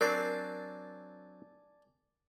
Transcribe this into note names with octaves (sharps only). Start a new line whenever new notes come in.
F#3 C4 D4 A#4 D5 G#5 A5